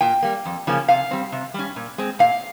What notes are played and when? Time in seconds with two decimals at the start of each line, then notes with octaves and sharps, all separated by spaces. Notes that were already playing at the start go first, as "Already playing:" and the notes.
0.01 A#2 G5
0.23 G3 A#3
0.45 F2
0.67 C#3 F3 A#3 C#4
0.88 C3 F5
1.11 G3 C4
1.32 C3
1.54 G3 C#4
1.76 A#2
1.98 G#3 C4
2.19 A#2 F5